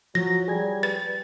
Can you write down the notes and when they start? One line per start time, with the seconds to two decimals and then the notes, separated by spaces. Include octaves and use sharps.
0.15 F3 F#3 A#6
0.48 G3 G#4 G#6
0.83 B4 A6